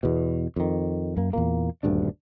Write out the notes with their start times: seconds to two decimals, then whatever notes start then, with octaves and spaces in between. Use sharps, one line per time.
0.03 E2 B2
0.56 F2 D#3
1.17 F#2 A#3
1.33 E2 A#2 A#3
1.83 D#1 D2 G2 D4